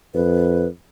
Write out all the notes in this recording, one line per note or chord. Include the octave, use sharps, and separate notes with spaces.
F2 B4